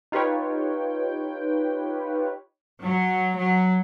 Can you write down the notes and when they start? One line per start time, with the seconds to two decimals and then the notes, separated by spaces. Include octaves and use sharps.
0.12 D#4 F4 G4 B4 C#5 G5
2.81 F#3
3.36 F#3